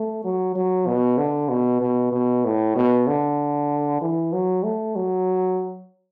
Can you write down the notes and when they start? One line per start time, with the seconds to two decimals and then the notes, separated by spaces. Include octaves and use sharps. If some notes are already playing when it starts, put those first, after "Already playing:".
Already playing: A3
0.24 F#3
0.55 F#3
0.87 B2
1.18 D3
1.49 B2
1.81 B2
2.12 B2
2.45 A2
2.75 B2
3.07 D3
4.01 E3
4.33 F#3
4.64 A3
4.96 F#3